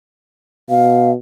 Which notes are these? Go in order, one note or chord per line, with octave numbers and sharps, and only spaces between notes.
B2 F5